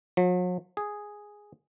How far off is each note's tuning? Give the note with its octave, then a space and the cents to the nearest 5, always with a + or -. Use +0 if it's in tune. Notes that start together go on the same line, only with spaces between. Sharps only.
F#3 -45
G#4 +0